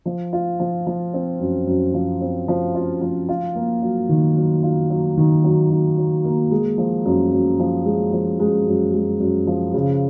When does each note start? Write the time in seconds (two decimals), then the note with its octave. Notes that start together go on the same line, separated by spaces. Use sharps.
0.06 F3
0.33 F4
0.60 F3
0.87 F3
1.14 C4
1.40 F#2
1.67 F#2
1.94 F3
2.21 C4
2.48 F3
2.75 F4
3.02 F3
3.29 F4
3.55 A#3
3.82 F#3
4.09 D#3
4.37 F#3
4.63 F4
4.90 F#3
5.17 D#3
5.44 F#3
5.70 F#3
5.98 F#3
6.24 A#3
6.51 G#3
6.78 F3
7.05 F#2
7.32 F#2
7.59 F3
7.86 G#3
8.13 F3
8.40 G#3
8.67 F#2
8.93 G#3
9.20 F#2
9.47 F3
9.74 C#3